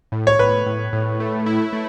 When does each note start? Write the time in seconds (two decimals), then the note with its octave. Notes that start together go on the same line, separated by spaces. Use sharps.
0.12 A2
0.27 C#5
0.39 A2 B4
0.66 A2
0.93 A2
1.20 A3
1.46 E4
1.73 A3